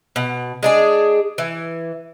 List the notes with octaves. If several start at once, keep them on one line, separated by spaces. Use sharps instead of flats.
B2
G#3 D4 G#4
E3